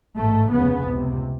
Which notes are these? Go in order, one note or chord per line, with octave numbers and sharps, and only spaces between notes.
A1 G#2 A3
F1 D#2 C#3 B3
C#2 C3